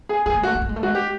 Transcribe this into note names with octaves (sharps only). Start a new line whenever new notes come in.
G#4
G#3 G#4
A3
G#3
F#4
A3
G#3
A3
G#3
A3
G#3 F#4
G4